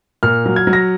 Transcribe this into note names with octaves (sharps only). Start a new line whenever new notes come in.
A#2 F6
F#3
G#6
F#3
A#6